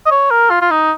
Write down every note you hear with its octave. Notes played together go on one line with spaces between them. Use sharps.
D#5
C#5
A#4
F4
F4
D#4